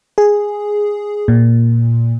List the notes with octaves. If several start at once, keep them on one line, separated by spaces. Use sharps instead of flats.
G#4
A#2